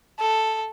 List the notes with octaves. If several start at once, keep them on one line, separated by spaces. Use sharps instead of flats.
A4